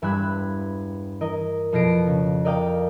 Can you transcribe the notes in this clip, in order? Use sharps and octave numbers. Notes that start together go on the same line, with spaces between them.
E1 G2 E5 G#5 B5 F#6
E3 A#4 D#5
F2 B2 F4 A#6 C7 D7
C#3
A#4 D5 D#5 F5 G5